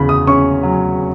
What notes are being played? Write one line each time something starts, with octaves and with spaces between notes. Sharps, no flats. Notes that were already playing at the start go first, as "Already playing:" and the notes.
Already playing: E2 C#3 B5
D#6
C#4 C#6
F#3